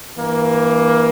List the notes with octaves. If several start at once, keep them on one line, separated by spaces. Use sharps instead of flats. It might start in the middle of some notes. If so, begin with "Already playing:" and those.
G2 E3 A#3